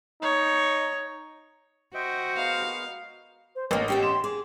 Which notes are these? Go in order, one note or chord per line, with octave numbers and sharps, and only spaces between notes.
D#4 C#5
F#4 C5 D#5 E5 G5
G#3 B3 A#4 F5
C5
A1 A#3 C#4 A#4
C#4 G4 E5 G5
C6 E7
G#4 D6